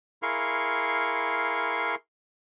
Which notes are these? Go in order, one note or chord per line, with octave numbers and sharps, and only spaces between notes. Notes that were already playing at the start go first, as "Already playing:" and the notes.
E4 G#4 A#4 F5 C6 C#6